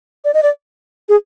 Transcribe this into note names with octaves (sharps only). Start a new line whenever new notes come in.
D5
D#5
D5
G#4